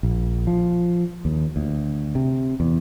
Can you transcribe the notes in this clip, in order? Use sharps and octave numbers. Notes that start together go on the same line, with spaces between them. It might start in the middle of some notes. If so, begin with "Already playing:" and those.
A#1
F3
D#2
D2
C3
E2